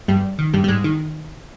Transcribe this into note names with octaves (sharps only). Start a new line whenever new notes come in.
G2 G3
D#3
G2 G3
G3
G#2 G#3
D#3